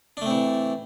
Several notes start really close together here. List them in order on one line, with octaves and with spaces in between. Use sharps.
D4 A3 C4 E3